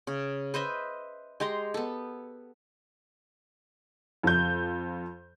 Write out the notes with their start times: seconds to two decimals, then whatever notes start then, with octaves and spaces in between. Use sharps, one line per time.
0.07 C#3
0.54 B4 C5 D#5 E5
1.40 G#3 G4 A#5 C6
1.74 B3 A4
4.23 F2 G6